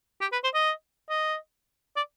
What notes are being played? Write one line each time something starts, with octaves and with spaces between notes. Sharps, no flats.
G4
B4
C5
D#5
D#5
D5